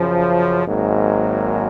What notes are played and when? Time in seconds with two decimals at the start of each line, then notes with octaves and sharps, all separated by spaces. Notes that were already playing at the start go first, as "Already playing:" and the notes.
Already playing: F#2 C#3 F3
0.66 G#1 G#2 F#3 A#3